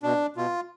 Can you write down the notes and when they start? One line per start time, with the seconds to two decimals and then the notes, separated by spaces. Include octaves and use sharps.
0.03 B2 D4
0.36 B2 F4